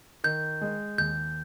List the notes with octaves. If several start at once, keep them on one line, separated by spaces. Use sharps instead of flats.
D#3 G6
G#3
D#2 G6